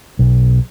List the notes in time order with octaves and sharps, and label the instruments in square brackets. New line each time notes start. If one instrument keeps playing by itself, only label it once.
[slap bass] B1